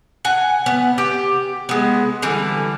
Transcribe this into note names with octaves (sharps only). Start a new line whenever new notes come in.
F#5 G#5
B3
G4
G#3 B3
D3 E3 G3